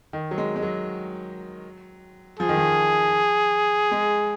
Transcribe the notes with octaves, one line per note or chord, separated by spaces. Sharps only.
D#3
F#3
G#3
G#3
F#3
F3 G#4
D#3
F3
G#3